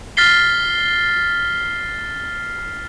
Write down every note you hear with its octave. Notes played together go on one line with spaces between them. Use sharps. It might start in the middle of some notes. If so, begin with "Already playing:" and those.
F6 A6 B6 C7 G7